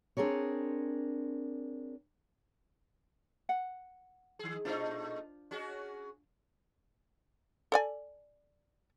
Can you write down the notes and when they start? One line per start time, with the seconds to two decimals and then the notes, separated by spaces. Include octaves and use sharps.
0.17 C4 D4 G#4 A#4 C#5
3.49 F#5
4.39 D#3 G#4
4.65 A#2 A3 D4 D#4 F4 C5
5.51 C#4 F#4 G#4
7.72 A4 D5 G#5